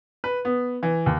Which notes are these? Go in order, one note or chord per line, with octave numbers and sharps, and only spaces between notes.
B4
B3
E3
D#2